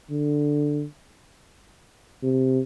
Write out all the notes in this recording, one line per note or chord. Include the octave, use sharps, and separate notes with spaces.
D3
C3